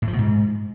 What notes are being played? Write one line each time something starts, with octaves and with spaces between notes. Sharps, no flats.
A2
F3
B2
G#2